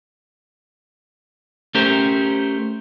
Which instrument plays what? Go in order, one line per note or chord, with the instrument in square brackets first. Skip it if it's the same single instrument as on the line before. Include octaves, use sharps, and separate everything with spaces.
[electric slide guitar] A3 C#4 G4 A#4 C5